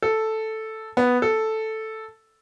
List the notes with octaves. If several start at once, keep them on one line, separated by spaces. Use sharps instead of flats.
A4
B3
A4